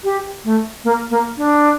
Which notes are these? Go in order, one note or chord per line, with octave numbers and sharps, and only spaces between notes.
G4
A3
A#3
A#3
D4